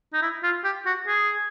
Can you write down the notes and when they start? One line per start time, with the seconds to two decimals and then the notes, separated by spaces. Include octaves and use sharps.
0.13 D#4
0.22 E4
0.43 F4
0.64 G4
0.86 F#4
1.07 G#4